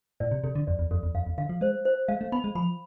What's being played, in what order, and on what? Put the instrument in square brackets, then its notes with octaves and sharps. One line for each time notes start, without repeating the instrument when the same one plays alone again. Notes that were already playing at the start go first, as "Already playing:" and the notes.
[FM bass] A2 [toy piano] D5
[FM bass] C3
[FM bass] C3 [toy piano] A4
[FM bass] D3
[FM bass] F2 [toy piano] D5
[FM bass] E2
[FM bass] F2 [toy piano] A4
[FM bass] E2
[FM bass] F2 [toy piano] F5
[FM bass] E2
[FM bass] D3 [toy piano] F5
[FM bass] F3
[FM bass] G#3 [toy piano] C5
[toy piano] C5
[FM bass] G#3 [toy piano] F5
[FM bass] A3
[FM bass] B3 [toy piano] B5
[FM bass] G#3
[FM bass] F3 [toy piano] B5